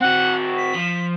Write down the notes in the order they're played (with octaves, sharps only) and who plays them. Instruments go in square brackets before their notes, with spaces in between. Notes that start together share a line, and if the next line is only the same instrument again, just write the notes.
[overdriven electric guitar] C4 F#4 [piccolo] F#5
[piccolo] B6
[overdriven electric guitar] F3